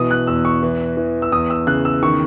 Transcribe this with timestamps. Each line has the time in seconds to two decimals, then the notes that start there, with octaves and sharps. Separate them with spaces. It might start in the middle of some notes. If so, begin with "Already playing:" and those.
Already playing: B2 E3 D#6
0.11 F#6
0.27 E2 E6
0.45 C#6
0.63 E3
0.97 E3
1.22 E6
1.32 E2 D#6
1.50 E6
1.67 C#3 F#6
1.85 E6
2.03 D#3 C#6